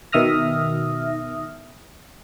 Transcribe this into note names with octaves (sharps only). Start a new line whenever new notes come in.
B2 D#3 E5 D#6 F6 A#6